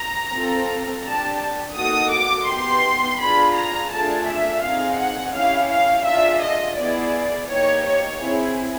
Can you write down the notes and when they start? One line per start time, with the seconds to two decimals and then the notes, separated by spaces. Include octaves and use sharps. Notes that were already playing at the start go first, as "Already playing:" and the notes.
Already playing: A#5
0.32 C4 F4 A4
1.04 D4 G4 A5
1.75 A#3 D#4 F#4 A4 D#6
2.11 D6
2.48 B3 D#4 G4 C6
3.19 D4 F4 G#4 B5
3.55 A#5
3.91 A3 D4 F4 G#4 A5
4.26 E5
4.62 C4 D#4 G#4 F5
4.98 F#5
5.33 C#4 E4 G4 F5
5.70 F5
6.05 D4 F4 G#4 E5
6.42 D#5
6.77 B3 E4 G#4 D5
7.49 A#3 D#4 G4 C#5
7.85 C#5
8.20 C4 E4 G#4